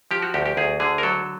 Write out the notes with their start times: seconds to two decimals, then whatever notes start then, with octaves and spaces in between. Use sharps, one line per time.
0.11 F3 G4
0.22 F#4
0.34 D2 G4
0.46 G4
0.57 D2 G#4
0.80 D3 G#4
0.98 A#4
1.03 F#3 A4